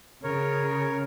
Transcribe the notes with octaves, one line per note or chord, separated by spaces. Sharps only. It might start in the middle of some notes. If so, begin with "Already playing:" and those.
C#3 A#4 C#5